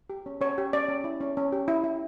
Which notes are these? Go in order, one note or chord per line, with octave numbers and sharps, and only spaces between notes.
G4
C#4
C#4 C#5
G4
C#4 D5
C#4
E4
C#4
C#4
G4
E4
E4